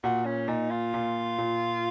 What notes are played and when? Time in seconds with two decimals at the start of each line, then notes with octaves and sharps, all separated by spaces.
0.04 A#2 F#4
0.25 C#4
0.48 A#2 D#4
0.70 F4
0.94 A#2
1.38 A#2